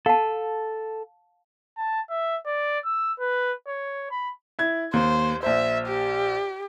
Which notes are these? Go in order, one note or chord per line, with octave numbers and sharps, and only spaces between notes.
A4 F5 A5
A5
E5
D5
E6
B4
C#5
B5
E4 G#6
D#2 C5
A#1 C5 E5
G4